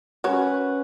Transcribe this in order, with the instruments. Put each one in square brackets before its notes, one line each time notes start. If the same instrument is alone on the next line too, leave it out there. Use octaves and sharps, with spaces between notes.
[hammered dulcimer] C#4 B4 F#5 [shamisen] F#4 A#4 C#5